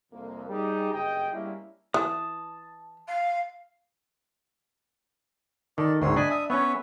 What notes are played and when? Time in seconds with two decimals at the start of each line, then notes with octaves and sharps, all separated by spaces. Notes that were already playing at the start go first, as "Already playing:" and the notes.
0.12 C2 F2 A#3
0.49 G3 D#4 G4 G#4
0.93 F#1 G2 G#4 D#5 G5
1.33 G3 G#3 A#3 C#4 D4 E4
1.94 E3 A5 D#6
3.07 F5
5.78 D#3 A4 D5
6.02 D2 G#2 C4 C#5 C6
6.16 D4 D#5 G#5 B5
6.30 E5 D#6
6.50 B3 C#4 B4 C#5 E5